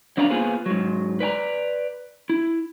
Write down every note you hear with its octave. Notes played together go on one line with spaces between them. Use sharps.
F#3 D4 B4 F5 A5 A#5
A#3 B3 F4 G#4 B4 C5
G#2 F#3
B4 D5 G#5 A#5
E4